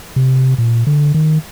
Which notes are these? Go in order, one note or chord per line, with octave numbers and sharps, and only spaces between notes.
C3
A#2
D3
D#3